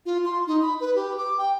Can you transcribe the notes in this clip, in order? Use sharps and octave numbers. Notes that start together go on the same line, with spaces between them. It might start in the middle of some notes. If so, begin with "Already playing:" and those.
F4
C6
D#4
B5
B4
G4
D6
G5